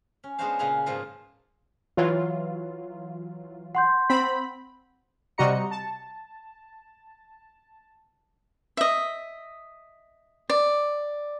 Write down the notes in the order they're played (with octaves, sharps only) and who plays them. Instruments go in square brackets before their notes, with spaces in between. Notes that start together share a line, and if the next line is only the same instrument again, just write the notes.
[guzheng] C#4
G#3 B3 D4 F#4 C5 F5
A#2 C#3 F5 F#5 G#5 A#5
G#2 B2 F3 A#3 D#4 F4
[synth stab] E3 F#3 F4
[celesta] F#5 C6 G6
[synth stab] C4 B5
C3 G3 F#4 D#5 A#5 C#7
A5
[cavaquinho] D#5 E5
D5